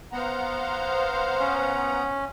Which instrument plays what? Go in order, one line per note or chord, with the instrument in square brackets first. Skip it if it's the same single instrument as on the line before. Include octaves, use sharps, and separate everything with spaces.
[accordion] B3 F#5 A#5 [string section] C5 F5
[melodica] C#4